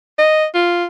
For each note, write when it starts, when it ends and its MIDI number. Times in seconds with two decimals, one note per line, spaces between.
0.18 0.46 75
0.54 0.85 65